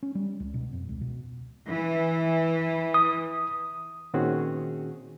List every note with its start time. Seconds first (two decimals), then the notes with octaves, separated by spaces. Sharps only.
0.03 C#4
0.15 G3
0.40 C#2
0.54 B2
0.72 F2
0.89 C#2
1.01 B2
1.68 E3
2.94 D#6
4.14 A#2 D#3 C4 C#4 F#4 G#4